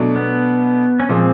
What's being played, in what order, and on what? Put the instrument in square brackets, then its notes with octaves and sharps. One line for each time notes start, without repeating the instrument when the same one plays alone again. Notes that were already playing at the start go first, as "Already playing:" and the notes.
Already playing: [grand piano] B2 F#3 A3 D4
[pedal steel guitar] B3
C#4
[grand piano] A#2 F3 G#3 [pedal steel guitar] C4